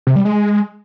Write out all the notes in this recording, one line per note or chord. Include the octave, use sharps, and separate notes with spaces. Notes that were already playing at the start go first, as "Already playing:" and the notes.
C3
G3
G#3